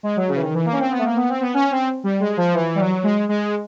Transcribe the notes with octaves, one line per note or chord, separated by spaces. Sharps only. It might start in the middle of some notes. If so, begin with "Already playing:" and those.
G#3
F#3
C#3
E3
D#3
E3
A#3
C#4
C4
B3
A3
A#3
B3
C4
B3
C#4
C4
G3
G#3
F3
E3
G3
F#3
G#3
G#3